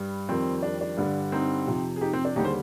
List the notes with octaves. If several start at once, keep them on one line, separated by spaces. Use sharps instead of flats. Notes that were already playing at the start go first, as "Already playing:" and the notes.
Already playing: G2 G3
F2 D#3 G3 C4
D4
D4
G2 D3 G3
C4 D#4
F2 C3 F3
G#4
D#4 G4
C4
D4
D#2 D3 G3 D#4 G4
G#4 C5